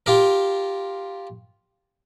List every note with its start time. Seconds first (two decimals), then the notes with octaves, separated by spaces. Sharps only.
0.06 F4 G4 A#4